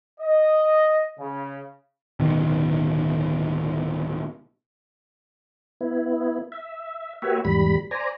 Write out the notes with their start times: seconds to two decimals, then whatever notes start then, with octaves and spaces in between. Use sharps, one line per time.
0.20 D#5
1.20 C#3
2.20 D1 B2 D#3
5.81 B3 E4
6.52 E5
7.22 A#3 F#4 G4 B4 C#5 E5
7.45 E2 G#2 G3 B5
7.91 C5 D5 G#5 A#5